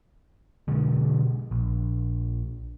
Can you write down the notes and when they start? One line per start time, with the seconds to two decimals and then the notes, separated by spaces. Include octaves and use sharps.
0.68 B2 D3 G#3
1.51 A#1